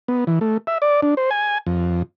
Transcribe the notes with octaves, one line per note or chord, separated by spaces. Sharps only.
B3
E3
A3
E5
D5
D4
C5
G#5
F2